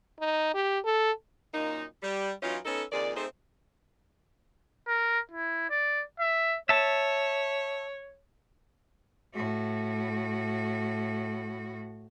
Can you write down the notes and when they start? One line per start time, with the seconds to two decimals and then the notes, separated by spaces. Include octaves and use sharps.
0.20 D#4
0.54 G4
0.84 A4
1.54 F#2 A#2 A#3 D#4
2.03 G3
2.43 E3 F#3 C#4 D#4 F4
2.65 B3 C#4 D#4 A4
2.92 F2 A#2 D#3 G#4 D5
3.16 A3 C4 D#4 G#4 A4 C5
4.88 A#4
5.32 E4
5.70 D5
6.20 E5
6.69 C#5 E5 A5
9.35 A2 F#4